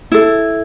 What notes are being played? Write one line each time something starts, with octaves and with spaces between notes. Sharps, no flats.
E4 A4